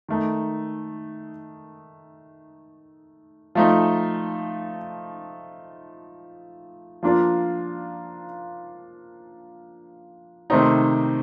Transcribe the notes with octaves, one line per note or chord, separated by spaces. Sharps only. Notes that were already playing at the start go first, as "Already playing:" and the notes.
D#3 A3 D#4
F3 A3 D#4
F3 A#3 D4 F4
C3 D#3 A3 C4 D#4